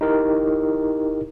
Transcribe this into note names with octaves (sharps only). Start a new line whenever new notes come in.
D#4 E4 G4 A#4